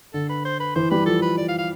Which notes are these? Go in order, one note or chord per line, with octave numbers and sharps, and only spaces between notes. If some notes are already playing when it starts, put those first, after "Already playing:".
D3 A4
B4
C5
B4
E3 C5
G3 B4
F3 A4
B4
D5
F5
F5